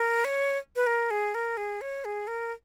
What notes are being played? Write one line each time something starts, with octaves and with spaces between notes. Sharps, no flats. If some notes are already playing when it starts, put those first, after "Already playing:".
Already playing: A#4
C#5
B4
A#4
G#4
A#4
G#4
C#5
G#4
A#4